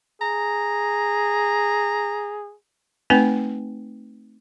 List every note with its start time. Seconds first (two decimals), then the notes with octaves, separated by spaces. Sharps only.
0.22 G#4 A#5
3.10 A3 C4 D#4 B4 G5